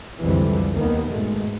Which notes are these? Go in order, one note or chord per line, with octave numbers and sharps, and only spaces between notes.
C2 F2 D3 E3 G3 G#3
D#2 D#3 A#3 B3
G#2 B2 G#3 A3